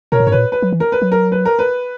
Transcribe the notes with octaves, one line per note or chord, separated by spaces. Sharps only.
B2 A#4 C#5
A#2
G#2 C#5
A#2 B4
B4
F#3
E3
A#4
B4
F#3
A#4
B4
A#4
B4